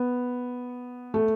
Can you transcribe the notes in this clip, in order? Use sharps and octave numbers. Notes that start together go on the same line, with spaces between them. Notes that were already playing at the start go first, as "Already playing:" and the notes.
Already playing: B3
A3